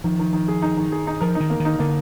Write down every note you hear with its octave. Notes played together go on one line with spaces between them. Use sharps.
D#3 F3
D#3
D#3
G#4
D#4
D#3
G#4
D#4
F3 A#4
D#4
D#3
A#3
D#3
D#4
D3 A#3